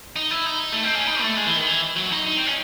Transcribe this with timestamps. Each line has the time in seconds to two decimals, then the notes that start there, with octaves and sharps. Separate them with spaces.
0.16 D#4
0.31 E4
0.46 D#4
0.72 A3
0.83 C4
0.95 C#4
1.06 D#4
1.21 A3
1.37 G#3
1.46 E3
1.56 D#3
1.66 E3
1.96 F#3
2.06 C#4
2.12 D#4
2.27 D#4
2.37 C4
2.46 C#4